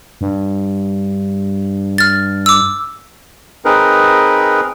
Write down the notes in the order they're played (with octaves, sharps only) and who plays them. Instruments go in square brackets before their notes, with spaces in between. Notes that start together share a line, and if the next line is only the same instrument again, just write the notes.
[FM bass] G2
[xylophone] F6 A6
D6 E6
[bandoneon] C4 D#4 G#4 A#4 B4